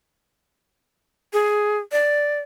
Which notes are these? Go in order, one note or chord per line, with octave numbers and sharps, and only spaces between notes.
G#4
D5